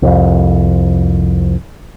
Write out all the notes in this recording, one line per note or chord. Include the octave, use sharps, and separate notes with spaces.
C2 F2